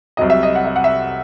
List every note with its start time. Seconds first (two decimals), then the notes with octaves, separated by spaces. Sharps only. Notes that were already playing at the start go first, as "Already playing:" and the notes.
0.17 C2 C3 F#3 D#5
0.30 E5
0.43 D#5
0.55 F#5
0.65 E5
0.76 F#5
0.84 E5